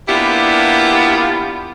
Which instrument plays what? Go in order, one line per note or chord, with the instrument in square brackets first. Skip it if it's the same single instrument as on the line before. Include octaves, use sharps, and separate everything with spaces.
[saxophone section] A#3 B3 D4 E4 F4 G4